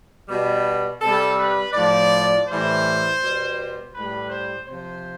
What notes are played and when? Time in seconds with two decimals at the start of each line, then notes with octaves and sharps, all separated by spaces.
0.28 B2 G3
1.00 C3 G3 A4
1.37 B4
1.73 A2 F3 D5
2.47 A2 E3 G3 C5
3.20 B2 G3
3.93 A2 G3 B4
4.30 C5
4.66 C3 F3 C5